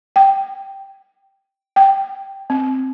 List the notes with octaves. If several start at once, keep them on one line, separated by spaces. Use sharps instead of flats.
G5
G5
C4